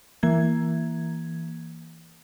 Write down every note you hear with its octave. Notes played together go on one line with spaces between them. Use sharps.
E3 A#3 G#6